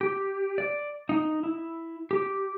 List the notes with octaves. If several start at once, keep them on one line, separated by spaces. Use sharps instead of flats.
G4
D5
D#4
E4
G4